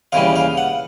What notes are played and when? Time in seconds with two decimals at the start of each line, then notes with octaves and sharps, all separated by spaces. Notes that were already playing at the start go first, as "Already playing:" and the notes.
0.12 D#2 C#3 E3 G3 F5
0.36 F5
0.58 F#5